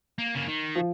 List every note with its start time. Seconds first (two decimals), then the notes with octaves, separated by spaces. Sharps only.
0.18 A#3
0.35 C#3 A#3
0.47 D#3
0.75 F3